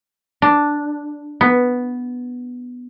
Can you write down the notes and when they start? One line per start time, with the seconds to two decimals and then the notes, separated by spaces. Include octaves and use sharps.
0.42 D4
1.41 B3